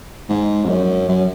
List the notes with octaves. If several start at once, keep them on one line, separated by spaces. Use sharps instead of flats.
G#2
F2
F#2
F#2